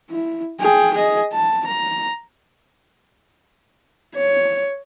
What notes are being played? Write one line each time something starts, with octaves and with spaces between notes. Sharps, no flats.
E4
G#4 G5
G#4 D#5
A5
A#5
C#5